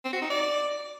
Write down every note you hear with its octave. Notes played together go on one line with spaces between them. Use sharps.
C4
F#4
D#4
D5